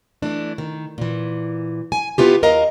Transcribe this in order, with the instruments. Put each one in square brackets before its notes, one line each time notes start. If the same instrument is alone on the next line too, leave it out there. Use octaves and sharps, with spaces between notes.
[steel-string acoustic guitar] E3 A3 D4
D#3
A#2 E3
G#5
B3 E4 F4 G4
D#2 A#4 D#5 F5 A#5